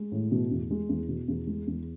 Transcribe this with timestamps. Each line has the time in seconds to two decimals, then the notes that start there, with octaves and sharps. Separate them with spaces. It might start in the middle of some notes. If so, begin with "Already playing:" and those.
Already playing: G#3
0.12 A2
0.32 B2
0.51 E2
0.71 G#3
0.89 E2
1.09 B2
1.28 E2
1.47 G#3
1.67 E2